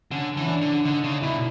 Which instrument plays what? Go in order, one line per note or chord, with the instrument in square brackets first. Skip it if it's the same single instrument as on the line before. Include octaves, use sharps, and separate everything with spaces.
[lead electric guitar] D3 [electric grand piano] C#4
[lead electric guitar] E3 [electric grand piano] C#4
[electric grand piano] D4
[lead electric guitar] D3
[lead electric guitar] D3 [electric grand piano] D#4
[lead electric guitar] C#3
[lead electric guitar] B2 [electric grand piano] E4